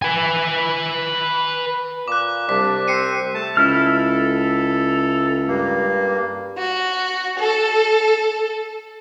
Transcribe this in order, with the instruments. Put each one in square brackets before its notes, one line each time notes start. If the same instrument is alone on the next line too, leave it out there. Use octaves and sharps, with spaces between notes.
[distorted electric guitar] B4 G#5
[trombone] A#2 [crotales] D6 F#6
[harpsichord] C2 [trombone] D4 [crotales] B6
[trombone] C4 [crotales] C7 C#7 D#7
[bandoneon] A3 A5
[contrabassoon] C#2 [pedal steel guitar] E4 F6 [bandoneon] A4
[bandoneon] G2 A#3
[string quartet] F#4
A4